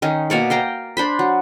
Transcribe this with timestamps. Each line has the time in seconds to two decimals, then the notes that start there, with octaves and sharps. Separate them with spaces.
0.02 D#3 C#4 D#4
0.30 B2 A#3 C#5 D5
0.50 F5 G5 A#5 D6
0.97 D4 C5 B5
1.19 F#3